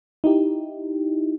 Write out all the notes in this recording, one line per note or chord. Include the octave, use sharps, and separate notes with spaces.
D#4 E4 G4